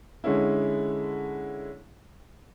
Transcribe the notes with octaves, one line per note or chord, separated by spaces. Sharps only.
D3 G#3 C#4 E4